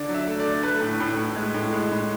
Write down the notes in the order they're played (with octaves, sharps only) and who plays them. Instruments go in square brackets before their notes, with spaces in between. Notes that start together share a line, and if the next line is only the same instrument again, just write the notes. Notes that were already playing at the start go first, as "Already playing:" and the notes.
Already playing: [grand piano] D3 D5
F#3
E5
A3
D5
D3
A3 B4
A2
A2
A2
G#3
A2
G#3
A2